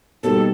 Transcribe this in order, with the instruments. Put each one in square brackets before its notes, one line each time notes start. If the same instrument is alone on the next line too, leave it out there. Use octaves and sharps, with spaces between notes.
[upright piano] B2 G3 A#3 D#4 [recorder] A4